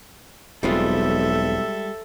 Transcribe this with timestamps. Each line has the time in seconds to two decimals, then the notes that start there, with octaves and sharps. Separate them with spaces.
0.63 E1 B1 G3 G#3 C4 F4 A4 E5